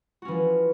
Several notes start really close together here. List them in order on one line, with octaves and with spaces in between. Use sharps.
F#4 C#4 E3 F3